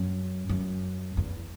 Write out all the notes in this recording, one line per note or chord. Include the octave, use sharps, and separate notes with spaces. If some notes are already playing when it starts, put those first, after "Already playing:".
Already playing: F#2
F#2
E2